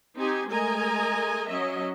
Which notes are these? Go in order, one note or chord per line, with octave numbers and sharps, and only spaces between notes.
C4 D#4 G4 G#5
G#3 A3 A#4 D#5 G#5 A#5
F#3 C#4 D#5 E5